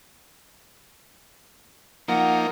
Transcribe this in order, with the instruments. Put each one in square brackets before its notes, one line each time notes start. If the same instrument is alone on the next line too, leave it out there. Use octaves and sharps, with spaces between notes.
[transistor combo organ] F3 A#3 D#4 [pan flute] F#5